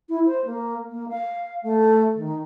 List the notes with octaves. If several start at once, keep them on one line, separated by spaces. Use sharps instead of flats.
E4
C5
A#3
A#3
F5
A3
D#3